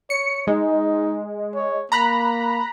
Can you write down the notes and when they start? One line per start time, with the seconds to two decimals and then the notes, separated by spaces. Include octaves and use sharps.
0.10 C#5 C#7
0.47 G#3 D#4
1.55 C#5
1.92 A#3 A#5 B5 F#6